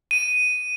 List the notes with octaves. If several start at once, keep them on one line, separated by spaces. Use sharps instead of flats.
D#7